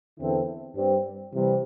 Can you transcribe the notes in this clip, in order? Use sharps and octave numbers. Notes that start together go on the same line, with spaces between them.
E2 D3 C4 E4 A4
G2 G3 C4
C3 E3 G3